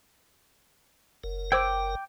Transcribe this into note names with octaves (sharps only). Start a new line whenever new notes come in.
F#1 A#4
C5 G5 D6 E6 G#6